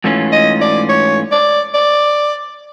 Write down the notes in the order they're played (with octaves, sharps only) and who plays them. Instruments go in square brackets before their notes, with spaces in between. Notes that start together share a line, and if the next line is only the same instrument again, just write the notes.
[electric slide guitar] G#2 E3 A3 C#4 F4
[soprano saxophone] D#5
D5
C#5
D5
D5